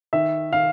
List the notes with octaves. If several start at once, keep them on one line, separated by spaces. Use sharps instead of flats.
D#3 E5
D#3 F5